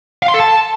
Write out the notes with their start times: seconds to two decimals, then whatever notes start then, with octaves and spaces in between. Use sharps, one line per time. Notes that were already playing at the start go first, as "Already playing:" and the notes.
0.23 F5
0.28 C6
0.34 A4
0.40 A5